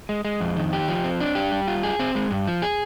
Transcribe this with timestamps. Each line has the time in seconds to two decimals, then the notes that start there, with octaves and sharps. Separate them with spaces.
0.09 G#3
0.25 G#3
0.40 F2
0.56 D#3
0.73 G4
0.88 F3
1.04 C4
1.20 D4
1.35 G4
1.52 G3
1.68 F4
1.83 G#4
1.99 C4
2.15 G#3
2.31 G2
2.47 F3
2.62 G#4